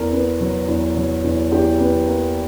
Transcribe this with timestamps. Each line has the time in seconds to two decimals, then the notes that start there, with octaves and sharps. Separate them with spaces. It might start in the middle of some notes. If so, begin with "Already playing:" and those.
Already playing: E2 A#4
0.13 B3
0.40 F#3
0.68 E2
0.97 F#3
1.24 E2
1.52 E2 G4
1.80 B3
2.07 A#3